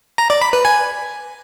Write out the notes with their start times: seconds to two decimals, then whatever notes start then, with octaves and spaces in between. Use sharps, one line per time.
0.18 A#5
0.30 D5
0.41 B5
0.53 B4
0.65 G#5